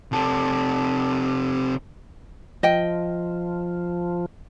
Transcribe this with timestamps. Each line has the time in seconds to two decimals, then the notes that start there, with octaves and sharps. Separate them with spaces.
0.12 C3 A4
2.63 F3 D#5 G5